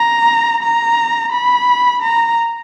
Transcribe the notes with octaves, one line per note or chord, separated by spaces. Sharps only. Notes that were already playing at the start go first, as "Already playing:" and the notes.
Already playing: A#5
A#5
B5
A#5